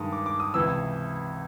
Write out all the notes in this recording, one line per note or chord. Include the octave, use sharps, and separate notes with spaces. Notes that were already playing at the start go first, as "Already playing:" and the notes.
Already playing: G2 D#3 G#3 D#6
D6
D6
D#6
C#2 C3 E3 E6